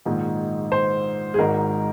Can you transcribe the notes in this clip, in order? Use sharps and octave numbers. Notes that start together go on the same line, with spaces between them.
A#1 G#2 D#3
C5
G#4
G#1 G#2 D#3 A#4